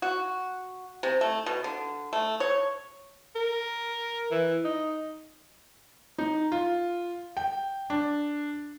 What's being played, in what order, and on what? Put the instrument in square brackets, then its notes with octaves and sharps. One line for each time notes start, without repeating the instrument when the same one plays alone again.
[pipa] F#4
C3
A3
B2
D3
A3
C#5
[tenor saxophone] A#4
E3
D#4
[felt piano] D#4
F4
G5
D4